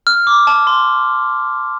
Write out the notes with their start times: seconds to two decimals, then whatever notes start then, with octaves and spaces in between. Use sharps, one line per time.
0.07 F6
0.27 D6
0.47 A5
0.67 C6